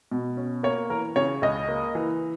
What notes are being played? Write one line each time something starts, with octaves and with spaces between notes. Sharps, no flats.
B2
C#4
A#3 C#5
E3 A#4
C#3 C#5
C#2 D#5
A#3
E3